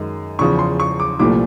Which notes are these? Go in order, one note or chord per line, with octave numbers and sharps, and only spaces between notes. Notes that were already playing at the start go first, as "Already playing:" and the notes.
Already playing: F#2 D#3 G#3
E2 C#3 F3 C#6
C6
C#6
D6
C2 A#2 F3 A3 D6